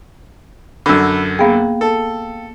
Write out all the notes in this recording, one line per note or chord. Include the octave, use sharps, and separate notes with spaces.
F#2 D3 B5 E6
A#3 B3 G#4 F5 G5
A4